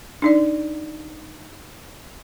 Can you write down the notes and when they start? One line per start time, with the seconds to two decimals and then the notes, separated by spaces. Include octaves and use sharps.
0.22 D4 D#4 D5